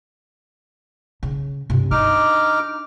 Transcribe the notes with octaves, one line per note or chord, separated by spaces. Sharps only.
C#3
G2 C3
D4 D#4 D6 F6